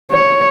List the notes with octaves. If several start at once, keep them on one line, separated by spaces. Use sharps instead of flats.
C#5